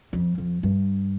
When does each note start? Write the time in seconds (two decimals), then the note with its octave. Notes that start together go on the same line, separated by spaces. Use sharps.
0.13 F2
0.38 F2
0.63 G2